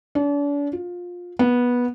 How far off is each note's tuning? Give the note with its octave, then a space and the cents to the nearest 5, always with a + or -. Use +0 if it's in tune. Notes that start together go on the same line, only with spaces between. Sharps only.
D4 -40
F4 +20
B3 -15